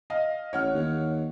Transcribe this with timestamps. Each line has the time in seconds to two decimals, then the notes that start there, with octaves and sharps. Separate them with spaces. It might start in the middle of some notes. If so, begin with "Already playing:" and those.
0.10 D#5 F5
0.53 A1 C#5 F#5 F6
0.74 D#2